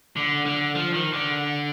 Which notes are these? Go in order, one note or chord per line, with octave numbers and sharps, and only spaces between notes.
D3
D3
F3
D#3
D3